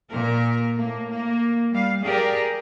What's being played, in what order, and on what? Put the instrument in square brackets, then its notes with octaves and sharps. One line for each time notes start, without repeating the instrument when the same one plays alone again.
[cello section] A#2 A#4
A2 A#3
A#3
G3 F5
G4 G#4 A#4 D5